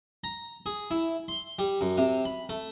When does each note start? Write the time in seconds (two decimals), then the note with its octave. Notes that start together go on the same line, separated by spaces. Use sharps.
0.24 A#5
0.66 G#4
0.91 E4
1.28 C6
1.59 G3
1.81 F#2
1.97 C3
2.25 B5
2.49 A3